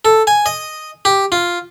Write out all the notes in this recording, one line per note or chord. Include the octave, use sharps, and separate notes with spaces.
A4
G#5
D#5
G4
F4